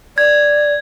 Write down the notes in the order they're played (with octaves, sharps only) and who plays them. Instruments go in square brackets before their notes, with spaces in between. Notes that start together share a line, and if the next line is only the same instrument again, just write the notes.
[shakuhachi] D5 [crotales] G#6